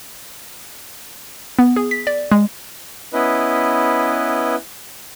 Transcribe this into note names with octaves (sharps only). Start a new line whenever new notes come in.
B3
G#4
B6
D5
G#3
B3 C#4 E4 B4 D#5